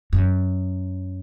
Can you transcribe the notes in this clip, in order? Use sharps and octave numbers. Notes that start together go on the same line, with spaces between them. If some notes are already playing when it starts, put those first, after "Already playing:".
F#2